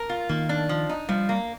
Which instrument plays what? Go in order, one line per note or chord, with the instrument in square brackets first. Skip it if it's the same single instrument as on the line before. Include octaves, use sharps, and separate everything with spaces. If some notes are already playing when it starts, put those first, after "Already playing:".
Already playing: [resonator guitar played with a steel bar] A#4
F4
[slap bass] D#3 [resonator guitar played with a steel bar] A#3
[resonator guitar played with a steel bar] D4
F3
D#4
[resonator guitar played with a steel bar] F3 [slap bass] G3
[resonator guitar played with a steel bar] A#3